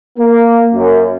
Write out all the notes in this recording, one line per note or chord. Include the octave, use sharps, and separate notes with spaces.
A#3
F#2